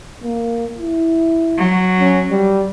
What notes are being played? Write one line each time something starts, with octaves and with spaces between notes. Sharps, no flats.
A#3
E4
F#3
C#4
G3